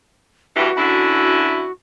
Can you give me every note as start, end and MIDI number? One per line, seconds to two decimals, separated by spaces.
0.56 0.69 38
0.56 0.69 43
0.56 0.69 52
0.56 1.71 66
0.77 1.66 42
0.77 1.66 50
0.77 1.66 64